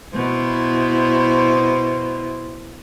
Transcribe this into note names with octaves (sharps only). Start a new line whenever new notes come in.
B2 E4 C5